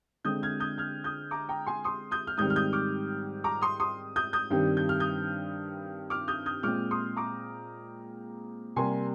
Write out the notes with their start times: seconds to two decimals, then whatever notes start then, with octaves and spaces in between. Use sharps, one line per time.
0.24 D3 G#3 C4 D#6 G6
0.43 F6 G#6
0.60 D#6 G6
0.78 F6 G#6
1.04 D#6 G6
1.31 A#5 D6
1.49 G5 A#5
1.66 G#5 C6
1.84 C6 D#6
2.11 D#6 G6
2.27 F6
2.37 G#2 D#3 G3 C4 D#6 G6
2.50 F6
2.56 D#6 G6
2.73 D6 F6
3.44 A#5 D6
3.62 C6 D#6
3.80 C6 D#6
4.16 D#6 G6
4.33 D#6 G6
4.50 G2 D#3 G3 C4
4.77 G6
4.89 F6
5.00 D#6 G6
6.10 D6 F6
6.28 D#6 G6
6.46 D#6 G6
6.63 A#2 G#3 C4 D6 F6
6.91 C6 D#6
7.16 A#5 D6
8.76 C3 G3 A#3 G#5 C6